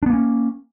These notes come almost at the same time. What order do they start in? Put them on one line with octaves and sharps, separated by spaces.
D4 B3 A#3 C#4